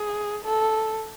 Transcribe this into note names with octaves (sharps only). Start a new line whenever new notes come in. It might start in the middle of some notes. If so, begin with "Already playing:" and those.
Already playing: G#4
A4